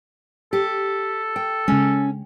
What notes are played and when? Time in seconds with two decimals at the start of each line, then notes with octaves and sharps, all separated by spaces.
0.53 G4 A4
1.36 G5
1.68 C#3 G#3 C#4